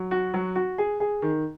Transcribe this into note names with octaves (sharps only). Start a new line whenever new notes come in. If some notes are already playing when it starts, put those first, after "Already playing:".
Already playing: F#3
F#4
F#3
F#4
G#4
G#4
D#3